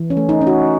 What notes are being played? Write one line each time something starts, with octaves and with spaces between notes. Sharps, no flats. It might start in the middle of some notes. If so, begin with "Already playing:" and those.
Already playing: E3
C#4
A3
D#4
C#4
F#4